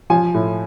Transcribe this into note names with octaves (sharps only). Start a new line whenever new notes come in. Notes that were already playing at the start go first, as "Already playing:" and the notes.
F3 G#5
A2